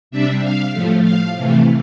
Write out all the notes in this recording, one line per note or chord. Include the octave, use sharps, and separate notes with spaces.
C3 G3 D4 E5
F5
A2 F3 A3
F5
C3 E3 A3